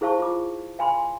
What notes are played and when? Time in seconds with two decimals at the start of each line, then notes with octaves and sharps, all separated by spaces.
0.01 E4 G#4 C5 F5 A5 C#6
0.20 F4 D6
0.79 F5 G#5 B5 C6